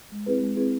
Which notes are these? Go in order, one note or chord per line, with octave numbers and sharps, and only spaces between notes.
G#3
C4 E4 G#4 B4
G#3
C4 E4 G#4 B4